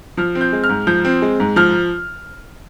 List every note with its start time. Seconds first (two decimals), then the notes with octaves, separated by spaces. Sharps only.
0.17 F3 F6
0.35 C4
0.41 G6
0.52 G#3
0.64 F6
0.69 G#2
0.87 F3 G6
1.05 C4
1.22 G#3
1.40 G#2
1.56 F3 F6